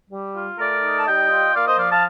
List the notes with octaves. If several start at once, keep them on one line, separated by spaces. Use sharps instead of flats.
G3
F4
A3 A#4 D5
D#4
A5
G3 D#5 G5
F4
A#3 D5 F5
C5 D#5
F3 D5 F5
F5 A5